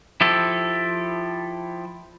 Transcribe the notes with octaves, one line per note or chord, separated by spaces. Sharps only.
F3 E4 G4 A4